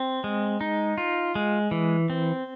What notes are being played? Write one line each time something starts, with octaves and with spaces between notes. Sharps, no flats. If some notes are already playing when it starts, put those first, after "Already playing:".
Already playing: C4
G#3
D#4
F4
G#3
E3
C4